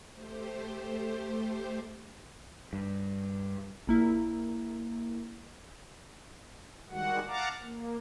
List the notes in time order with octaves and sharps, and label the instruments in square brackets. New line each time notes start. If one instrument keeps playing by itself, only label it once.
[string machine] A3 G4 C5
[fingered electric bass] G2
[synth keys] A#1 A#3 E4
[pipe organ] D#3 G3 G#3 F#4 F#5
F5 F#5 A5 A#5 D6
A#3